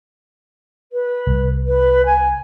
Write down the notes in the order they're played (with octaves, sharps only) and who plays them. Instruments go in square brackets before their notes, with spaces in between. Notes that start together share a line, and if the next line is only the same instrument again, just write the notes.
[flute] B4
[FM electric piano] C2
[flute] B4
G#5